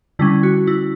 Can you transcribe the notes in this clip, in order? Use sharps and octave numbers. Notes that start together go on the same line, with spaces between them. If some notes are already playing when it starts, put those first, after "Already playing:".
D3 G3 C#4 E4
F#4
E4